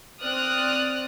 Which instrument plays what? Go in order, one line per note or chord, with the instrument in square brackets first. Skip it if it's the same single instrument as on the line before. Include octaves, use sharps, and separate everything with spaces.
[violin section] C4 D5 D#6 F6 F#6